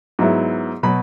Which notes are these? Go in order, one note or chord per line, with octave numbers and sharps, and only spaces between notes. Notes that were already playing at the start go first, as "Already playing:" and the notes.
G#2 F#3 B3 E4
B2 F#3 B5